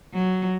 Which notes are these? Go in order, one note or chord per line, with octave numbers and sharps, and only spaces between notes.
F#3